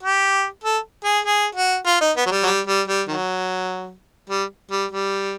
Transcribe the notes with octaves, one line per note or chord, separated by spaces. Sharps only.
G4
A4
G#4
G#4
F#4
F4
D#4
B3
F#3
G3
F#3
G3
G3
G3
D#3 F#3
G3
G3
G3